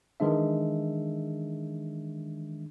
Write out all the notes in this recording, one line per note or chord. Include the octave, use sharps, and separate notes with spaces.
D#3 E3 G#3 D4 E5